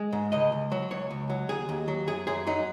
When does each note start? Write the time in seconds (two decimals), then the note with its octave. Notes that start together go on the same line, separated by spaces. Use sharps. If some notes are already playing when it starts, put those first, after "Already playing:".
Already playing: G#3
0.13 G#2
0.32 C#2 D#5
0.52 C#2
0.72 F#3
0.91 C#2 C#5
1.11 C#2
1.30 F#3
1.49 D#2 G#4
1.69 D#2
1.88 F#3
2.07 F#2 G#4
2.27 F#2 G#4
2.47 F#3 D#4